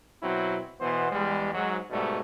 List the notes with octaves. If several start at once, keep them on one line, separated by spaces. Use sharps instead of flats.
B2 F#3 C4 E4
B2 E3 B3 C5
E2 G3 G#3
G#2 F#3
G#2 B2 G3 A3